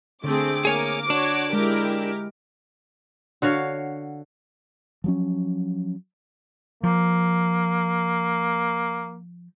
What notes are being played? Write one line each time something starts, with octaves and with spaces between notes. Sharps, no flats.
D3 A3 C4 G#4 D6
A#3 G#4 A#4 C#5 G#5
D4 F#4 C#5
G#3 E4 G4 A#4
D3 F#4 C#5 F5
F3 F#3 C#4
F3 A#3